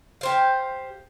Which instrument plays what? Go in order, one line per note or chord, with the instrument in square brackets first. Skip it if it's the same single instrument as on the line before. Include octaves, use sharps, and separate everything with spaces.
[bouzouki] G4 C5 F5